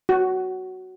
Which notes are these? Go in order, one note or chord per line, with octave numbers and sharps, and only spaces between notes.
F#4